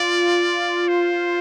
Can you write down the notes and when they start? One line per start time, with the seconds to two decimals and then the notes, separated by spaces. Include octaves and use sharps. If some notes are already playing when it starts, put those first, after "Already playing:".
Already playing: F4 D5
0.88 C5